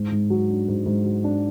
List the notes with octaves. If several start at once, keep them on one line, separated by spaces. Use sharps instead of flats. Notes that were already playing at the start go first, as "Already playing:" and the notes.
Already playing: G#2
G#2
F#3
D4
G#2
G#2
F#3
D4